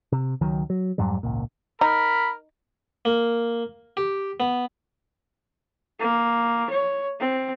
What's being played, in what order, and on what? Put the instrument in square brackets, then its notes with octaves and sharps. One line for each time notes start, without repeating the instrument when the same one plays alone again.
[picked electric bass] C3
C#2 D#3 F#3
F#3
F2 G#2 F#3 G3
G#1 C#2 A#2
[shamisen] D#4 [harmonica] A#4 [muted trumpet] B5
[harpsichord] A#3
G4
B3
[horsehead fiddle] A#3
C#5
C4